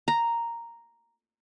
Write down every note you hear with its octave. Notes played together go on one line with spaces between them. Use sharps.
A#5